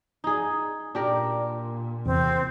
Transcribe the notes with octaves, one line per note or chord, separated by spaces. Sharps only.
D#4 G#4
A#2 D4 G4 A#4
E2 C3 C4